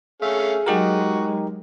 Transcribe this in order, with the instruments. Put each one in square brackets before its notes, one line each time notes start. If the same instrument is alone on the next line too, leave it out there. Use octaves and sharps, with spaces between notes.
[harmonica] A3 C#4 F5 [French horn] G#4 [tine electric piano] E5
[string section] F#3 G#3 [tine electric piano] D#4 G4 A#4 [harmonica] F#4